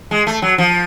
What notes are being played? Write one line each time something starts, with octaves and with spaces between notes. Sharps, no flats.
G#3
A3
F#3
F3